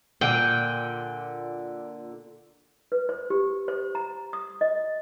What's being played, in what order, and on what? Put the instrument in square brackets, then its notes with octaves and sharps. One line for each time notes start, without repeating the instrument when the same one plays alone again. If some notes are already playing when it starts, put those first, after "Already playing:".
[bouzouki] A#2 D3 [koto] G5
[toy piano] B4
C5
G4
C5
A#5
D#6
D#5